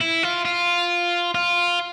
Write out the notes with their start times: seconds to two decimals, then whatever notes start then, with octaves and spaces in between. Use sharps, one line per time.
0.01 E4
0.23 F4
0.45 F4
1.34 F4